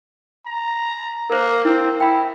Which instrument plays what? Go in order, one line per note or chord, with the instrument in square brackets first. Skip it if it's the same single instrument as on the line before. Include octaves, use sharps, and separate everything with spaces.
[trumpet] A#5
[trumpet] A#3 [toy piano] A#4 C5
[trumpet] C4 [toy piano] E4
[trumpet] E4 [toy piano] G5 B5